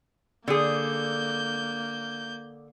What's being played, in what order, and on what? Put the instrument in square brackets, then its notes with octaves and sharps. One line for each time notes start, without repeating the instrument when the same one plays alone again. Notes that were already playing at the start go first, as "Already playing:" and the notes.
[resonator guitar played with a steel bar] D3 G#4 [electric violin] A#3 G6